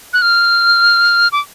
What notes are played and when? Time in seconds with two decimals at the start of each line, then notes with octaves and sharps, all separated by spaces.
0.13 F#6
0.22 F6
1.32 D6